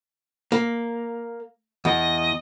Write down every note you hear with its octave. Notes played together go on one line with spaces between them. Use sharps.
A#3
E2 D#5